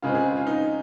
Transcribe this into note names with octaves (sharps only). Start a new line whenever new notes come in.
C#3 G#3 C4 F4
G#4
F4
F4
D#4